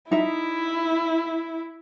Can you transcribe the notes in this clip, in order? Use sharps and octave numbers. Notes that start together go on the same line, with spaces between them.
D#4 E4 E5